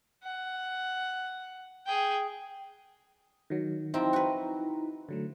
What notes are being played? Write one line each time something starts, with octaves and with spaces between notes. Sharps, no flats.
F#5
G#4 G5
D#3 F#3
F3 C4 D#4 E4 A#5
F#4 B4
D3 F#3 A3